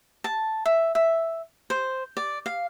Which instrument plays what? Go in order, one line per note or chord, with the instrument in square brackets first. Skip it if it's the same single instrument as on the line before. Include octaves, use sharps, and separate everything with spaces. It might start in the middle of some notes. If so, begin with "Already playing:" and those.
[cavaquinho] A5
E5
E5
C5
D5
F5